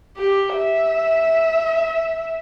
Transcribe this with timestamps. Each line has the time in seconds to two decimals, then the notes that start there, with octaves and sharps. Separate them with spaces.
0.17 G4
0.56 E5